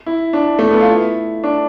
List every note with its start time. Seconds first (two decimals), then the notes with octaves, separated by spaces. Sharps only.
0.06 E4
0.33 D4
0.59 A3
0.71 B3
0.80 F4
0.89 E4
1.44 D4